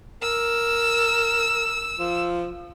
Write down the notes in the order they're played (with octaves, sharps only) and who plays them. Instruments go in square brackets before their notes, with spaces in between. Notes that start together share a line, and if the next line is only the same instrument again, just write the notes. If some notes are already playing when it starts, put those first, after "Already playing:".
[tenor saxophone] A#4 [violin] E6
[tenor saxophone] F3